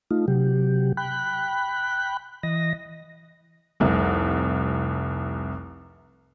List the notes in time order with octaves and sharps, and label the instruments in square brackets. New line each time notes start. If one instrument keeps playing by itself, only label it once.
[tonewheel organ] A3 D#4 F4
C3 F#3 G4
G5 B5 F#6
E3 D#5 A#6
[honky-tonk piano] F1 C2